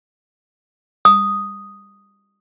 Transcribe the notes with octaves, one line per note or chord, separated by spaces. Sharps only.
D#6